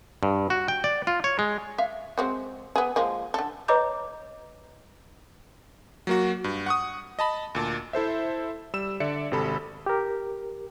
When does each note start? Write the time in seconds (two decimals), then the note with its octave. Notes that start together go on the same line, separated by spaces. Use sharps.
0.23 G2
0.50 F#4
0.68 G5
0.84 D5
1.07 F4
1.24 C#5
1.39 G#3
1.78 E5 F5
2.18 G#3 C4 F#4
2.76 B3 G#4
2.96 F3 G#3 A#3
3.34 D3 A4
3.68 B4 C#5 D#5 A#5 D6 G6
6.07 F#3 A#3 F#4
6.44 G2
6.66 F#5 C#6 D#6
7.19 D#5 A5 B5
7.55 D2 A#2 A5
7.93 E4 A4 C5 E5
8.74 G3 E6 E7
9.00 D3 D5 E5 C#7
9.31 G#1 C3 A4 B5
9.86 G4 A#4